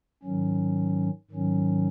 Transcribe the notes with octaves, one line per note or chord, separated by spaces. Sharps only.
G#2 D#3 F#3 C#4
G#2 D#3 F#3 C#4